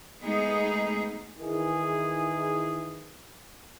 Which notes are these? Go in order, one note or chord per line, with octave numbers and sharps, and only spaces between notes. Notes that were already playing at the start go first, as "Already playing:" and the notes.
G#3 A3 B3 D#4 G#4
D#3 E3 G#4